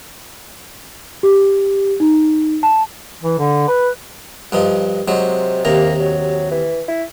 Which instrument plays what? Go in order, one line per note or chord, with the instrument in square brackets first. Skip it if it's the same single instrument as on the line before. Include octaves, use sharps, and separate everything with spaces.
[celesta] G4
D#4
A5
[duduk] E3
D3
B4
[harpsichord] G2 F3 D#4
[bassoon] C3 [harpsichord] F#3 G#3
[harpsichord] D#2 C3 A#5 [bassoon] A#3
[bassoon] F#3
E3
E4